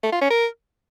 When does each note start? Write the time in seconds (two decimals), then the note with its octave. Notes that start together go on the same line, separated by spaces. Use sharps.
0.03 A3
0.12 F4
0.21 C#4
0.31 A#4